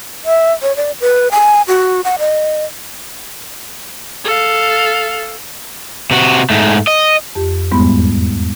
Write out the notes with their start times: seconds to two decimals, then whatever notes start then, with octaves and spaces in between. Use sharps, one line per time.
0.25 E5
0.62 C#5
0.76 D5
1.01 B4
1.31 G#5
1.68 F#4
2.04 F#5
2.19 D#5
4.25 A4 F5
6.11 C3 F#4
6.50 G#2 A3
6.87 D#5
7.35 F2 G4
7.71 E2 G#2 G3 G#3 B3 B5